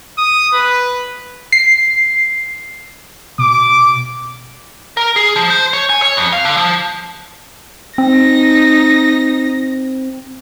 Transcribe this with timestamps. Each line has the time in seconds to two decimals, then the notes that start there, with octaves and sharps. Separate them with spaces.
0.18 D#6
0.53 B4
1.52 C7
3.39 B2 D6
4.97 A#4
5.16 G#4
5.36 F3
5.50 C5
5.73 C#5
5.89 G#5
6.02 C#5
6.17 F2
6.33 F5
6.45 D3
6.57 F3
7.98 C4 D#4 A#6